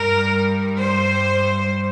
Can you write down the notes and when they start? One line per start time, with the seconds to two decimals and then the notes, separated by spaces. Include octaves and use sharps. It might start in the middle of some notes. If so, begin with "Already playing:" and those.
Already playing: G2 G3 A#4
0.81 C5